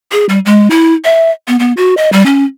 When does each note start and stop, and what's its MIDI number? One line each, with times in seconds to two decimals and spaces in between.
0.12 0.25 68
0.29 0.39 55
0.45 0.68 56
0.70 0.94 64
1.05 1.31 76
1.48 1.59 59
1.59 1.73 59
1.77 1.95 66
1.97 2.10 75
2.12 2.25 55
2.26 2.44 61